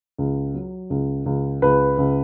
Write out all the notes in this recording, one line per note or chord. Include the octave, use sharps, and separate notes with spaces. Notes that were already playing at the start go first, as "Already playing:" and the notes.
C#2
F#3
C#2
C#2
C#2 B4
C#2